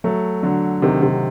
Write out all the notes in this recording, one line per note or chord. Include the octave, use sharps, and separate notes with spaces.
F#3 A3
D3 F#3
C3 D#3
C3 D#3